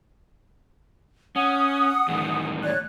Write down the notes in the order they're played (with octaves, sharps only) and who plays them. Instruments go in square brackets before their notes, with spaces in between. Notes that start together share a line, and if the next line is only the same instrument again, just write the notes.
[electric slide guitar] C#4 [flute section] F#5 D#6
[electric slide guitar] E2 A2 D#3
[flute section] C#5 D5 F#6